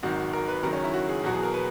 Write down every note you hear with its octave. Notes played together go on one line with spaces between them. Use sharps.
G#1 G#2 D#3 F#3 F#4
A#4
B4
F#1 F#2 D#3 F#3 A#4
C#4
E4
F#4
G#4
E2 B2 F#3 F#4
G#4
A#4
B4